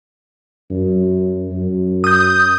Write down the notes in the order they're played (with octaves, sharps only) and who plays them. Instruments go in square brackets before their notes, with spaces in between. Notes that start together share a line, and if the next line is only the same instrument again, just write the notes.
[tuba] F#2
F#2
[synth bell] D#6 G6